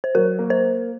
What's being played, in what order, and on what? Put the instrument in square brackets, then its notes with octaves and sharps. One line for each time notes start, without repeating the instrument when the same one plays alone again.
[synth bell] C5
[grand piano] F#3 [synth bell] A#4
[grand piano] A#3
[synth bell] C5